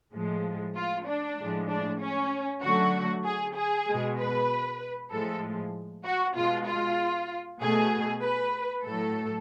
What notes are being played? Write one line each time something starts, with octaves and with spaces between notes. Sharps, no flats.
A2 F3 G#3
F4
D4
A2 F3 G#3
D4
C#4
D3 F#3 A3 F#4
G#4
G#4
B2 G#3
B4
A2 F3 G#3 A4
F#4
B2 G#3 F4
F4
B2 A3 G#4
B4
A2 F#3 A3 A4